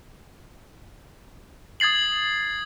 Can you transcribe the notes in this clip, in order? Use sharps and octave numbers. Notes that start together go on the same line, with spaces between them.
D#6 G#6 A6 C7 F#7